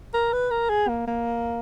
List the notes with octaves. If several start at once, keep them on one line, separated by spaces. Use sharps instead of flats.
A#4
B4
A#4
G#4
A#3
A#3